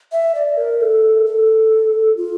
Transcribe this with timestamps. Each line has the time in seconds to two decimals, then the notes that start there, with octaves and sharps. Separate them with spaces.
0.12 E5
0.35 D5
0.57 A#4
0.81 A4
1.26 A4
2.17 F4